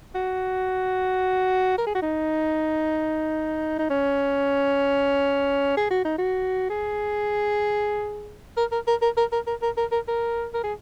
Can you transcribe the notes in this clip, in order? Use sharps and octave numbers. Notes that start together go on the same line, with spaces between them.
F#4
A#4
G#4
F#4
D#4
D#4
C#4
G#4
F#4
D#4
F#4
G#4
A#4
A#4
A#4
A#4
A#4
A#4
A#4
A#4
A#4
A#4
A#4
A#4
G#4